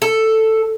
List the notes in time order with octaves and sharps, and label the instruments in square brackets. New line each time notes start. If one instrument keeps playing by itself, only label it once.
[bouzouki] A4